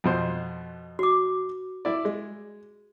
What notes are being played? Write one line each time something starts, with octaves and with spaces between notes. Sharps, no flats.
F2 B2 C5
F#4 D6
E4 D5
G#3